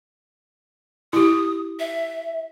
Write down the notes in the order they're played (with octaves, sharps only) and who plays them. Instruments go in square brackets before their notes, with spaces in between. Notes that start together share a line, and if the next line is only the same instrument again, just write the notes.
[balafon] E4 G4 [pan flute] D#6
[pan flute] E5